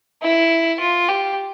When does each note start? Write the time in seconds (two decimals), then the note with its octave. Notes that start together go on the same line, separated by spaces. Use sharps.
0.22 E4
0.80 F4
1.08 G4